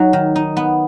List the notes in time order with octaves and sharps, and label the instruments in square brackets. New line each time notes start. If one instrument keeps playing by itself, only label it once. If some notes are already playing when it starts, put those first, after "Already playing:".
Already playing: [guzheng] F#3 D#4
D#3
D#4
B3